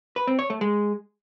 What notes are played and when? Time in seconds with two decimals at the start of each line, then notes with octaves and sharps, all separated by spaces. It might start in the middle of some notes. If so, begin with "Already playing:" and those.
0.16 B4
0.27 C4
0.39 C#5
0.50 A3
0.61 G#3